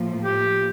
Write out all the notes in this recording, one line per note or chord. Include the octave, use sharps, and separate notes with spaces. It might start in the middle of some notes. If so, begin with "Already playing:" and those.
Already playing: A2 F3 A#3
G4